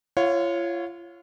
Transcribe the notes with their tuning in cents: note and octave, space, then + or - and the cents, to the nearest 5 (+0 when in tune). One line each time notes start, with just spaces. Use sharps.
F4 -35 C#5 -5 F5 +40